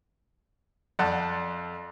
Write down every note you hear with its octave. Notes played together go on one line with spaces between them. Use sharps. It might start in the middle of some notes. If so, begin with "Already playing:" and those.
F2 D5 F#5 A5